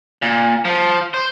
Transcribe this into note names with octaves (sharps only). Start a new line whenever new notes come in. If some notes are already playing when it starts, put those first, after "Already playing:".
A#2
F3
C5